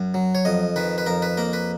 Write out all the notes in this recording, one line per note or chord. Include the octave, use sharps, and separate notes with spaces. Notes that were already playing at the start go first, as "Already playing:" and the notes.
Already playing: F#2
F#3
C#5
F2 D#5
D#3 B4
B4
F2 A#4
B4
A#3 A#4
B4